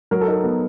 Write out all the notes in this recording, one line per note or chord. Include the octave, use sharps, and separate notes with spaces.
F#3 A#4
A4
D#4 A#4
B3